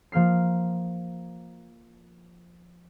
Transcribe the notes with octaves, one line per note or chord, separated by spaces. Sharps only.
F3 A#3 F6 C7